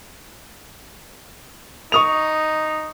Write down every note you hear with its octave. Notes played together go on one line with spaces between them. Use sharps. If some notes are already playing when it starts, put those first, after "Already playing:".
D#4 C#6 D#6 F7